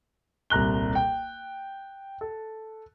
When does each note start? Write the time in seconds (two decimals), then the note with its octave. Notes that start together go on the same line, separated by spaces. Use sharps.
0.50 D#1 C2 A#5 F#6 G7
0.95 G5
2.21 A4